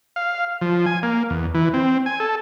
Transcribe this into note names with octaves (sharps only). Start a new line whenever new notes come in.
F5
F3
G#5
A#3
E2
E3
C4
G#5
A4